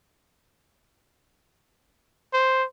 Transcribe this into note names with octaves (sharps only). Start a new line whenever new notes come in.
C5